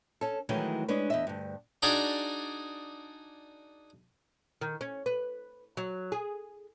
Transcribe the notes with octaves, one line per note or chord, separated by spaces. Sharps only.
C#4 A4
D#3 E3 F#3 G#3 A3 C#4
G#3 C#4 D4 B4
E2 D#5 E5
D2 G2
D4 D#4 F#4 G#4 D5
D#3
C#4
B4
F#3
G#4